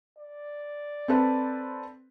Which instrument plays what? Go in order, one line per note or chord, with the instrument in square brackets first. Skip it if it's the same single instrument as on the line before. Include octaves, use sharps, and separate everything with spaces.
[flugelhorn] D5
[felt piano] C4 A4 B4